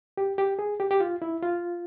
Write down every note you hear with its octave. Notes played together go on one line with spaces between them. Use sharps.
G4
G4
G#4
G4
G4
F4
E4
F4